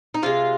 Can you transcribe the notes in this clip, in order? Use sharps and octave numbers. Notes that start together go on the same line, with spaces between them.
D#4
C3 F3 G#3 F4